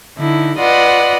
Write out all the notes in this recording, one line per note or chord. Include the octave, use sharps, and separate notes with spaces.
D3 D#4 E4
F4 B4 D5 D#5 F#5